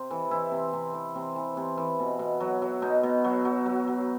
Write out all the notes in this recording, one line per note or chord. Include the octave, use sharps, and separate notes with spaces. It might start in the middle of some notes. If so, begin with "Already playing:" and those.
Already playing: C3
E3
E3 E4
C3
C3
E3
C3
E3
C3
E3
B2
B2
F#3
F#3
B2 D#4
B2
F#3
F#3
F#3
F#3